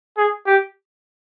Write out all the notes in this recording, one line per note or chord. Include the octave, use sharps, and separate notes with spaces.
G#4
G4